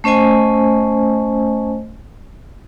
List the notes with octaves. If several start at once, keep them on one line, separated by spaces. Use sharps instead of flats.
A3 C#4 C5 D#5 G#5